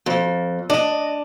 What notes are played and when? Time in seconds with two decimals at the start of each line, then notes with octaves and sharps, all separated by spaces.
0.06 F2
0.70 D4 D#5